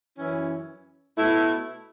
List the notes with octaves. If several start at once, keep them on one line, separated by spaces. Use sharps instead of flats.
F#2 E3 C#4 E4
B2 A3 E4